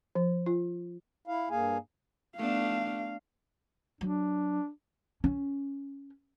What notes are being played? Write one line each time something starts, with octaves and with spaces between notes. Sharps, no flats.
F3
F4
E4 F5
G2 A#3 G#4 F5 G#5
A3 B3 D4 F5
F#3 D4
C#4